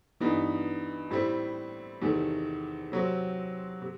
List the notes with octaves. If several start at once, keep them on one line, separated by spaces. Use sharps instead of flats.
G2 E3 B3 D#4
A2 G3 C4 E4
E2 C3 D#3 A3
C3 F#3 C4
C3